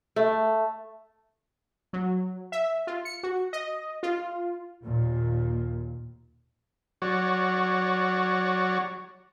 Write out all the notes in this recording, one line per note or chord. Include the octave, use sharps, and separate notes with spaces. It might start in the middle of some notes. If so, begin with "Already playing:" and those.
A3
F#3
E5
F4
C#7
F#4
D#5
F4
D#2 A#2
F#3 F#4 C#5 D5